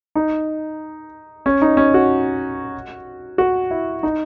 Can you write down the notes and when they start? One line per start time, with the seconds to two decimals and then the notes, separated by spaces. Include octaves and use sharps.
0.16 D#4
1.46 C#4
1.62 D#4
1.77 C#4
1.94 F#4
3.38 F#4
3.71 E4
4.03 D#4